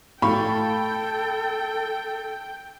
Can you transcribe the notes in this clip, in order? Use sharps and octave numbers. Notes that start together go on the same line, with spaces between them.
A2 A4 F5 G5 B5 C#6